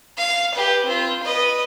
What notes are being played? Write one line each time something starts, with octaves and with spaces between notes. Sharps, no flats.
F5
G4 B4
C4 F4
B4 D#5